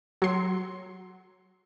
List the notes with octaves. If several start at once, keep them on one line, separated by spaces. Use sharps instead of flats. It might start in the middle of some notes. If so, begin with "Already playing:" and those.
F#3 C6